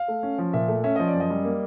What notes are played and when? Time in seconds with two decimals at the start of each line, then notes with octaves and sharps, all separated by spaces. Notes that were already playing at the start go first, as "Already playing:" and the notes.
Already playing: F5
0.08 A3
0.23 C#4
0.38 F3
0.53 A#2 E5
0.68 A3
0.84 C#4 E5
0.96 F3 D#5
1.08 D5
1.14 F#2
1.20 D#5
1.30 G3
1.45 A#3